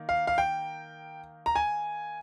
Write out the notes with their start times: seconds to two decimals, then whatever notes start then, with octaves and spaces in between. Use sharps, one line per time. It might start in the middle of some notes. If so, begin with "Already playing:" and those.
Already playing: D#3 A#3
0.09 F5
0.27 F5
0.38 G5
1.46 A#5
1.56 G#5